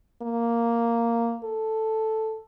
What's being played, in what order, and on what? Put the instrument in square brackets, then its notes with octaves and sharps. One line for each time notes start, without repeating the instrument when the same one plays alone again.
[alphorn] A#3
A4